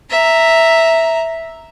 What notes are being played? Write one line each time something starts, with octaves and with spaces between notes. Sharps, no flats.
E5 A#5